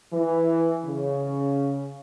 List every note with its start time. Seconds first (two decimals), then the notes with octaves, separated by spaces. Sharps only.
0.13 E3
0.86 C#3